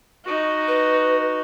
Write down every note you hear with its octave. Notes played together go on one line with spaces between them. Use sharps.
D#4 F#4
B4